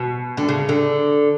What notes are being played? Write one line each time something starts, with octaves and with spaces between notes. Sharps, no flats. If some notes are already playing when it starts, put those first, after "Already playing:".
Already playing: B2
D3
C#3
D3